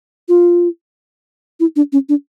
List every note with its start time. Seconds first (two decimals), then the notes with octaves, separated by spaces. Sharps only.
0.29 F4
1.60 E4
1.76 D4
1.93 C#4
2.09 D4